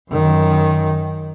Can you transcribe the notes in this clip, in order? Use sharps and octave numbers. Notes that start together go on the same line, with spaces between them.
F#2 D#3